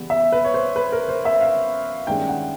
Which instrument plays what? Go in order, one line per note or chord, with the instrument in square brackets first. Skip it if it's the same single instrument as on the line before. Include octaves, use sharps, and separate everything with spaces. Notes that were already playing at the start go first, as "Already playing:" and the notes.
Already playing: [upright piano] C#3 E3 G3 B3
E5
B4
C#5
C5
B4
A#4
C5
E5
F5
G2 D#3 G#3 C#4 G5
F#5